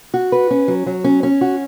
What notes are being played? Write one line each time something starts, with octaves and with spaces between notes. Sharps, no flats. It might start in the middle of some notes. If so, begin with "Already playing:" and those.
F#4
B4
C#4
F#3
F#3
C#4
C#4
F#4